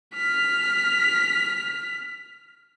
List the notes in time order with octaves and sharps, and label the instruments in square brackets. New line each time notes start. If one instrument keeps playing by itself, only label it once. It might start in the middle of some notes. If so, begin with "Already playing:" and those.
[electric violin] F6 B6